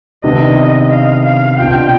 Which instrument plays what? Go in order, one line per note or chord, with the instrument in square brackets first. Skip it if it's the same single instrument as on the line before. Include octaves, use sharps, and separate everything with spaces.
[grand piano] C3 D#3 B3 D4 [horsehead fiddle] D#5
[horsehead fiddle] F5
F5
[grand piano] B2 B3 D4 F4 [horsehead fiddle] G5